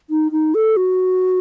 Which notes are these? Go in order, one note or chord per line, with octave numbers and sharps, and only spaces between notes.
D#4
D#4
A4
F#4